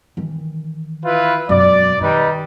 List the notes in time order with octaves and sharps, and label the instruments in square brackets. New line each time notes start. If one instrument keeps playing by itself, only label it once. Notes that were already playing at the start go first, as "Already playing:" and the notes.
[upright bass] D#3 E3
[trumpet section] E4 F4 B4
[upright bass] E1 F#2 [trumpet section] D5
[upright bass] D#3 [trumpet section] G3 D#4 B4